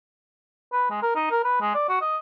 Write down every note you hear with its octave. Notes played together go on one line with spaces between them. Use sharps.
B4
G#3
A#4
D#4
A#4
B4
G#3
D5
F#4
D#5